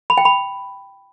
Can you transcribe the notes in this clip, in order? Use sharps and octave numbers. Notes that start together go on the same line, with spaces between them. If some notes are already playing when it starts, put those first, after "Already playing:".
B5
G5
B5